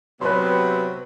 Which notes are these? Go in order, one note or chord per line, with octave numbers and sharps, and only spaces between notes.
C3 F#3 B3 B4 C6